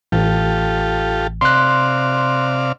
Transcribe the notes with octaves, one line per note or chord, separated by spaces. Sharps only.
A1 F4 G4 A4
C3 D5 F5 C6 F#6